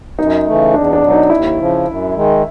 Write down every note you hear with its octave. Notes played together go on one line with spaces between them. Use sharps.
F#2 D#4
C#3 E3 A3
E2 D4
D4
B2 F#3
D#4
D#2 E4
C#3 F3
F#2
D#3 G#3